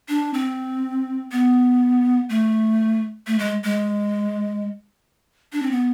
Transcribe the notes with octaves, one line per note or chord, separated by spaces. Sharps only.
D4
C4
B3
A3
A3
G#3
G#3
D4
C4
B3